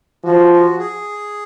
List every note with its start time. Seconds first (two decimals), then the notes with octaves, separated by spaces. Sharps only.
0.24 F3 F#4
0.51 F#4
0.79 G#4